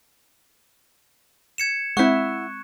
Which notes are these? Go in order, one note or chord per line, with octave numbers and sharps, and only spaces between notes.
G#6 C#7 E7
G#3 C4 E4 F#5 C#6 F#6